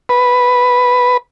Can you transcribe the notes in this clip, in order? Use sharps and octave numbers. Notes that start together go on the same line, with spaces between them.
B4